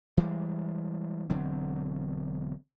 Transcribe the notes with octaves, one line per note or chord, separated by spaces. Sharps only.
E3 G3 G#3
E1 D3 F#3 C4